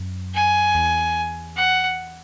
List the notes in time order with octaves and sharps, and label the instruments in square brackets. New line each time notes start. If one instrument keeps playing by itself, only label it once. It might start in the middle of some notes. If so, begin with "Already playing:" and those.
Already playing: [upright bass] F#2
[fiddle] G#5
[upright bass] E2
[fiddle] F#5